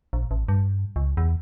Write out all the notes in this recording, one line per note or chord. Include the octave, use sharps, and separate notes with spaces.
A#1
A1
G2
C#2
E2